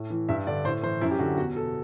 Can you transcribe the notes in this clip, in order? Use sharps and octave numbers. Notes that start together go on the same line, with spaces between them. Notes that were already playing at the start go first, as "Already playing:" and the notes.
Already playing: A2
E3
G2 E5
D3 D5
A2 C5
E3 C5
F#2 E4
G4
D3 F#4
E2 F#4
B2 A4